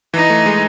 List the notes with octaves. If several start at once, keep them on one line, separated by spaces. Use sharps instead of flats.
E3 D#4
A3
G#3